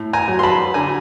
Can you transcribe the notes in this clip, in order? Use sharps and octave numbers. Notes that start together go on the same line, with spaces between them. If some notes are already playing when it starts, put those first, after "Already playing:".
Already playing: A2
G#5 A#5
F#3
C6
A5 B5
D3 G#5 A#5